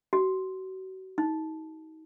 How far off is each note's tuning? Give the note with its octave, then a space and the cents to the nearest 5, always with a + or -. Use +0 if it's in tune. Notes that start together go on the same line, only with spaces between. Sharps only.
F#4 +35
D#4 +30